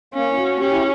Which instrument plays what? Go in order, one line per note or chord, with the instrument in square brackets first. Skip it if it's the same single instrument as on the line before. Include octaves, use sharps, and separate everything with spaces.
[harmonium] A#3 [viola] C#4
[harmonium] E4
F#4
[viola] C#4 [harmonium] G4
[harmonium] E4